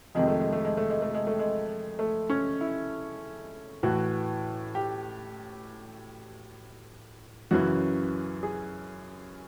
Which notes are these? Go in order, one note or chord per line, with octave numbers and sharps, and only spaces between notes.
F2 C3 D#3 G#3
A3
G#3
A3
G#3
A3
G#3
A3
G#3
A3
G#3
A3
C#4
E4
A2 E3 F#4
G4
F#2 C#3 E3 F#4
G#4